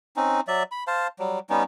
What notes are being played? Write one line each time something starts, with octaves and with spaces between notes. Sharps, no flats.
C4 C#4 D#4
F#3 D5 E5
B5
C5 F5 A5
F#3 G3
G3 B3 C#4 D#4